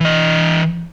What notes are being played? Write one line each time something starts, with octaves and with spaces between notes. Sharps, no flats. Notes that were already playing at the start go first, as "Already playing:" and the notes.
E3 D#5